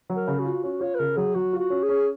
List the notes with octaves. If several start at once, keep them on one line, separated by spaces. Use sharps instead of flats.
F#3
A#4
C#3
F#4
F4
C#4 F#4
F4 C#5
B4
C#3 A#4
F#3 G#4
F#3 F#4
F4
F#4
C#4
G#4
C#4